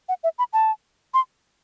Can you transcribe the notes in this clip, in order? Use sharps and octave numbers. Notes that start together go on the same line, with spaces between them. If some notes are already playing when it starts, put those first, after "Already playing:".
F#5
E5
B5
A5
C6